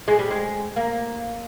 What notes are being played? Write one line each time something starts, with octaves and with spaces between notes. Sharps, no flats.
G#3
G3
G#3
A#3